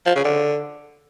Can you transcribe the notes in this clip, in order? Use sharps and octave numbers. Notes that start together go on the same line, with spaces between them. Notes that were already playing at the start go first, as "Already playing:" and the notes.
F3
C#3
D3